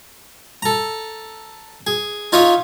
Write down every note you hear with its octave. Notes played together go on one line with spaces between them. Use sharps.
A4 A#5
G#4
D#4 F4 C#5 D#5 E5